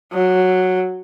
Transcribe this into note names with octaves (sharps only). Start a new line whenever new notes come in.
F#3